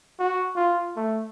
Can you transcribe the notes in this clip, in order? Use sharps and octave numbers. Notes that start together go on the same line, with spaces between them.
F#4
F4
A3